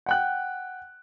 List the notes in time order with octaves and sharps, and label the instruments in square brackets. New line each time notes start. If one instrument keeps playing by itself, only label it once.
[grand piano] F#5 G5 F#6